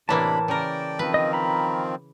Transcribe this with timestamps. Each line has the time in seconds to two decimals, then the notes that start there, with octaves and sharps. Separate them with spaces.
0.09 A2 C3 E3 A#3 D4 A5 B5
0.48 C#3 A#4 D5 G5
0.99 D#3 F3 C4 B4
1.14 D#5
1.33 A#5 B5